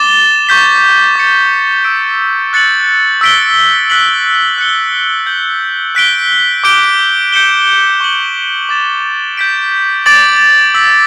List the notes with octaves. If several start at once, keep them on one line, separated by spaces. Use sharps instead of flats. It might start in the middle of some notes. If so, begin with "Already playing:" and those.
Already playing: D6 A6 E7 G7
C#6 G6 B6 E7
D6 A6 C#7
E6 B6 D7
F#6 A6 C#7 F#7
E6 B6 D7 G7
F#6 B6 F#7
F#6 C#7 G7
G6 B6 F#7
F#6 B6 D7 G7
D6 G6 D7 G7
G6 C#7 E7 G7
C#6 G6 C#7 F#7
D6 A6 E7
G6 B6 D7
D6 A6 D7 F#7
E6 B6 F#7